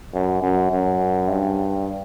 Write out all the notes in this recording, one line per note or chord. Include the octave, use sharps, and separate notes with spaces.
F#2
F#2
F#2
G2